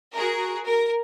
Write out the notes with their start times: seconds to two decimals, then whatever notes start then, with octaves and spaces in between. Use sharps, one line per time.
0.13 F#4 G#4 A#4
0.65 A#4